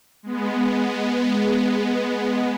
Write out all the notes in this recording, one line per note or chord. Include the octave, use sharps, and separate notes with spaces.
G#3 B3